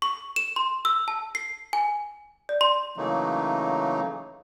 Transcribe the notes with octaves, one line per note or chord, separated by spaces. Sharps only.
C#6
E7
C6
E6
A5
C7
G#5
D5
C6
C#3 E3 F#3 A3 A#3 D#4